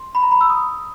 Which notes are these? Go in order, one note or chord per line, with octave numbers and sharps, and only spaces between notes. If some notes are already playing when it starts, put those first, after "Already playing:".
Already playing: C6
B5
A#5
B5
E6
D#6